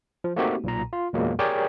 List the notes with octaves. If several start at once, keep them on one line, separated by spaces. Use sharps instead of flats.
F3
A3 A#3 C4 D#4 F#4 G4
B1 A#2 A#5
F4
E2 A#2 F#3 G#3 A#3
G4 G#4 A#4 C#5 D5 G5